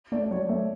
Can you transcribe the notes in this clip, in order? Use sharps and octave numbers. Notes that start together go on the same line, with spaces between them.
A3 D5
D5
F#3 C#5
A3 E5